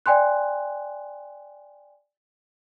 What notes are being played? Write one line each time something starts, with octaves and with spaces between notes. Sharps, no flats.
D5 G5 G#5 C6 F#6